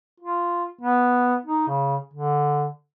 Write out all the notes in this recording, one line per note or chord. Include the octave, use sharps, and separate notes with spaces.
F4
B3
D#4
C#3
D3